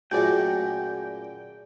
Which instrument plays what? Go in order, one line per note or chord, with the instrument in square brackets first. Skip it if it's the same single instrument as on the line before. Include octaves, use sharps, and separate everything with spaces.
[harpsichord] F#2 A#2 A3 [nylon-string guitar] F#4 G#4 D5 [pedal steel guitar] G5